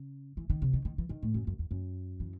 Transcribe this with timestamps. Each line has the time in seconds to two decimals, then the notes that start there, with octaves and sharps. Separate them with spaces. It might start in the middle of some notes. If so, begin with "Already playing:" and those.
Already playing: C#3
0.37 E3
0.50 D#3
0.62 C3
0.73 D#3
0.85 D#3
0.98 E3
1.09 D#3
1.23 A2
1.34 F#2
1.47 F#2
1.59 E2
1.71 F#2
2.20 E3